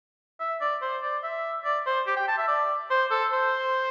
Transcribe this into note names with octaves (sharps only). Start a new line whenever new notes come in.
E5
D5
C5
D5
E5
D5
C5
G4
G5
A5
E5
D5
C5
A4
C5